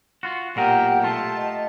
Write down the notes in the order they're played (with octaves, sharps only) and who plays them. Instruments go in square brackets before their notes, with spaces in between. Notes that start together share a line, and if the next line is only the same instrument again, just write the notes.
[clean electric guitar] F4 F#4
[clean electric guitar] B1 A#2 A#4 [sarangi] G4 [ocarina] F#5
[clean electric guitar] A3 F4 [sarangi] A5
[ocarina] D#5